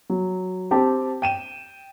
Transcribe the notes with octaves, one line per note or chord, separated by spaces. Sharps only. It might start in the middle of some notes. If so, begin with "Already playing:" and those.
F#3
C4 G4 A5
G5 D#7 E7